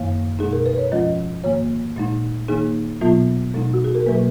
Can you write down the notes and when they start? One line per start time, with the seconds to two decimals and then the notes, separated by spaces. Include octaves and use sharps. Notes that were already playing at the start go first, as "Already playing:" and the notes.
Already playing: F#2 D#3 A#3 F5
0.39 B2 G#3 D#4 G#4
0.53 A#4
0.66 B4
0.78 C#5
0.91 G#2 F3 G#3 C#4 F4 D#5
1.44 G#2 D#3 A#3 C#5
1.96 A#2 G#3 D#4
2.48 D#3 A#3 D#4 G#4
3.01 B2 F#3 B3 F4
3.54 B2 G#3 D#4
3.74 F#4
3.84 G#4
3.95 A#4
4.06 B2 F#3 A#3 B4